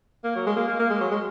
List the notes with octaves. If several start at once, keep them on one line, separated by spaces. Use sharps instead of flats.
A#3
F#3
G#3
A#3
A#3
A#3
G#3
F#3
G#3